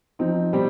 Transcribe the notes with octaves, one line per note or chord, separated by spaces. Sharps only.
F3 C4 D#4
B2 G3 C4 G4